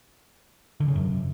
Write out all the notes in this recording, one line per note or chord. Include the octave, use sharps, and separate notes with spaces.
D3
C#3
F#2